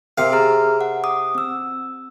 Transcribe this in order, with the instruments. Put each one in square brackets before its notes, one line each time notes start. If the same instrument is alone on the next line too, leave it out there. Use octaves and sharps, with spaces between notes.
[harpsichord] C3 F5 [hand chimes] A#4
[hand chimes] G#4 A#5 F6
F#5
D6 D#6
C4 E6